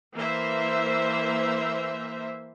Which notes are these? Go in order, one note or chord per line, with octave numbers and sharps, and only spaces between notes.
E3 A#3 C5 E5